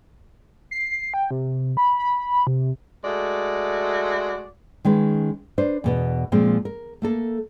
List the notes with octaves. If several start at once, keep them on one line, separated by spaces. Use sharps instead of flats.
C7
G5
C3
B5
B5
C3
G#3 A3 F#4 D5
D#3 G#3 C#4 B4
D4 B4 C5
E2 B2 B3
A#2 F3 G#3 C4
A#4
A3 A#3 A4